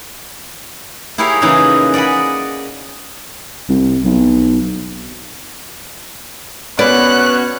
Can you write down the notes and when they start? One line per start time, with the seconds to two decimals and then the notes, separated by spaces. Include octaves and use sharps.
1.18 E4 G4 G#4 A#4 C#5 F5
1.42 C#3 E3 A#3 C#4 D#4 E4
1.94 D5 D#5 F#5 G#5 B5
3.69 C2
4.05 B1
6.79 B3 C#4 F#4 B4 C#5 D5 F#6